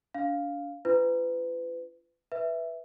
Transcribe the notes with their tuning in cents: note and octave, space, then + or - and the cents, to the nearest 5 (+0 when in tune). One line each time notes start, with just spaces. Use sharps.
D4 -35 F5 +0
D4 +0 F4 -40 B4 +30
B4 -5 E5 +0